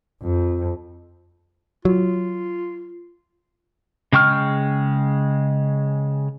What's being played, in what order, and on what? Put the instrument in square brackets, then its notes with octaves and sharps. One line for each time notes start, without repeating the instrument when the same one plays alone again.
[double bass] F2
[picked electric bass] F#3 [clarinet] F4
[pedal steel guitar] C#3 G#3 G5 C#6 F6